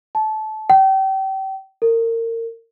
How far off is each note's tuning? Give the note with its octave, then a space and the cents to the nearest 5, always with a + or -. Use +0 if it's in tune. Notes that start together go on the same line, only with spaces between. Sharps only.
A5 -20
G5 -30
A#4 -30